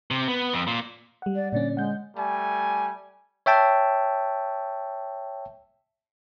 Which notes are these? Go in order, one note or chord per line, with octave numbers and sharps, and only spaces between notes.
C3
B3
F2
A#2
G3 F#5
D5
A#2 D3 C#4 D5
G#3 F#5 G6
G3 A3 G#5
C#5 E5 G5 A5